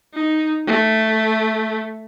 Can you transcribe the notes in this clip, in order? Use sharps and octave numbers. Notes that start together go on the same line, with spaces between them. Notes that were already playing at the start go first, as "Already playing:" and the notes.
D#4
A3